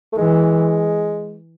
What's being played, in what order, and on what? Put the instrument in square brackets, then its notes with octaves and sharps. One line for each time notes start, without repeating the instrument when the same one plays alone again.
[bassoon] A3
[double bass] E3 [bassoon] G#3